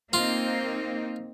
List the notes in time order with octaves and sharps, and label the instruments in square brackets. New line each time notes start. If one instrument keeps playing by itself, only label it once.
[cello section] A#3 C4 D#4 [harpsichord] F4